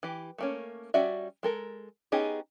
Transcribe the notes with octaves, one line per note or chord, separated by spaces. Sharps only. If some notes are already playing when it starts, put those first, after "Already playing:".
E3 G4
A3 A#3 C#4
G3 C#4 F#4 D5 E5
G#3 A4 A#4
B3 C#4 D#4 G4 G#4